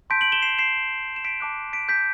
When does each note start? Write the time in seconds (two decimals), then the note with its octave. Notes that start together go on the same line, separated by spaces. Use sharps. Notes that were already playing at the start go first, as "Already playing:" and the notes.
0.10 A5 C6 G6 B6 D7
0.21 D7 F#7
0.32 E7 G7
0.42 C7 E7
0.59 C7 E7
1.16 E7
1.25 B6 D7
1.40 A5 D6 F#6
1.73 B6 D7
1.89 G6 B6